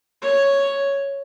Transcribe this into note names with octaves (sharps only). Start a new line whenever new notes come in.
C#5